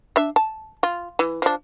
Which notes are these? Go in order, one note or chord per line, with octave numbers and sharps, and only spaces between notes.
D4 E5
A5
F4
E3
F3 D4